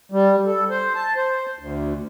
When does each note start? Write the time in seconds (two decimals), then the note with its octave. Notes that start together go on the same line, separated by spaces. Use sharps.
0.12 G3
0.46 A4
0.70 C5
0.96 A5
1.16 C5
1.59 D2